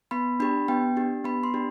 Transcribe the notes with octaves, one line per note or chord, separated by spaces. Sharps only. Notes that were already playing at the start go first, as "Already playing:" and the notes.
B3 B5
D4 G4 B5
B3 G5
D4 G4
B3 B5
C6
D4 G4